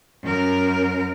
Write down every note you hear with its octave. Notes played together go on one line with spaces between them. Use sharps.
F#2 A#4